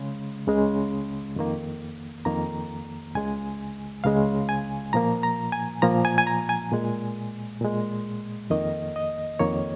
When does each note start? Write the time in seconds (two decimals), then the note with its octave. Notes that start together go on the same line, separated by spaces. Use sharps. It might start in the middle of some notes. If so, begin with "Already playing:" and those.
Already playing: C#3 G#3
0.47 C#2 C#3 G#3
1.36 F2 D#3 A#3
2.25 F2 D#3 A#3 A#5
3.15 C#2 C#3 G#3 G#5
4.04 C#2 C#3 G#3 F5
4.49 G#5
4.93 A#2 F3 A#3 A#5
5.23 A#5
5.52 G#5
5.82 A#2 F3 A#3 A#5
6.05 G#5
6.18 G#5
6.27 A#5
6.49 G#5
6.71 A#2 G#3
7.61 A#2 G#3
8.50 F2 D#3 A#3 D#5
8.96 D#5
9.39 F2 D#3 A#3 C#5